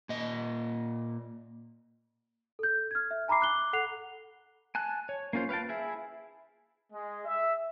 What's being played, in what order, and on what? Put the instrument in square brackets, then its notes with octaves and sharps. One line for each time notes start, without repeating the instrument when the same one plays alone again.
[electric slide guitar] A#2 D#5
[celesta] A4 G6
F6 G#6
E5
G#5 A#5 B5 D6 C7
D6 F#6 G7
A4 F#5 F#6 C7 F7
[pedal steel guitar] G#5 A5 F#6
C#5
A#3 C#4 F4 C5
B4 F5 G5 A5
E4 G#4 E5
[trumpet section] G#3
E5